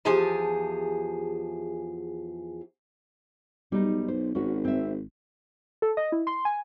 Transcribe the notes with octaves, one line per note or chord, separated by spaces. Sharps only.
E2 F3 G4 G#4 G#5 A5
B1 G3 D#4
C5
G#1 C#4 F#4
C4 E5
A4
D#5
E4
C6
G#5